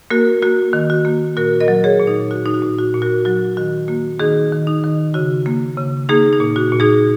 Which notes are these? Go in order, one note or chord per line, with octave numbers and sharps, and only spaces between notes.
A#3 F#4 A#4
A#3 F#4
D#3
F#4
A#3
A#2 F#4 A#4
A#4 D#5
F#3
G#4 C#5
A#2
D#4
A#2 F#4
D#4
F#4
A#2
F#4
A#2
F#4 A#4
F#3 F#4
D#3 F#4
A#3 F#4
D#3 D#4 G#4
D#3
D#4
D#3
C#3 F#4
A#3
C#3
A#3 D#4 G#4
D#4
A#2
F#4
A#2
D#4 G#4